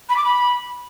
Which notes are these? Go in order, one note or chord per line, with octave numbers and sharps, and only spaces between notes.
B5
D6
B5